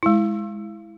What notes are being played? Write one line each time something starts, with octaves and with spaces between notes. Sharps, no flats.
G#3 E4